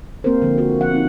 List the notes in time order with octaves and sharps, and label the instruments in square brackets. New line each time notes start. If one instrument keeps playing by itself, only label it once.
[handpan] A#3 C4 G4 A#4 C5
D3 F3 A#3
A#3 F#4
F3 F#5
C4 D#4